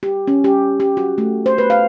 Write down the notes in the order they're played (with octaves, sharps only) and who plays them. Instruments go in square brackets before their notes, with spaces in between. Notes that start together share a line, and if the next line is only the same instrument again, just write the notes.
[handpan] G4
C#4
G4
G4
F#4
A3
C5
B4
F5